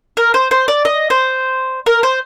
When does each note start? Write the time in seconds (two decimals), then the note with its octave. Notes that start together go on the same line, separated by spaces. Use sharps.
0.17 A#4
0.34 C5
0.51 C5
0.68 D5
0.85 D#5
1.10 C5
1.86 A#4
2.03 C5